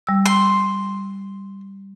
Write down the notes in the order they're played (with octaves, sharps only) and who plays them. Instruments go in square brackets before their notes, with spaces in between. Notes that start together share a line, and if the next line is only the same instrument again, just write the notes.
[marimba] G3 E6
[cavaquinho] C6